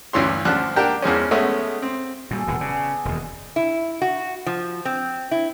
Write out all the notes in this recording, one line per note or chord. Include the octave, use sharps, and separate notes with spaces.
D2 G2 E3 C#5 C6
D2 F3 D4 F#5 F#6
A#3 D4 G4 A#4 F#5 G5
E2 F3 G#3 C#4
G#3 A3 B3 C#4 E5
C4
A#2 G3 F#4 G#4 A4
E1 A#2 D3 B3 F#5
C#3 F#4 G#4 D5
E1 D#2 D#5
E4
F#4
F3
C4
E4